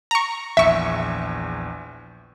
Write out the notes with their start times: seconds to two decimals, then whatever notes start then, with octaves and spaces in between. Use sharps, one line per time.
0.11 A#5 C#6
0.57 A#1 E2 E5 C#6